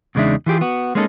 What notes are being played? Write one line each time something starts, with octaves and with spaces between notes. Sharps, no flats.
E2 C#3 G#3 D4 D#4 E5
E3 F4 G4 G#4
B3 F#4
G#3 A#3 C#4 D#4 G4 A4